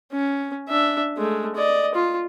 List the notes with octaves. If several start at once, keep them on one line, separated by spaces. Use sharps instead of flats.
C#4
D4 E5
G#3 A3
D5 D#5
F4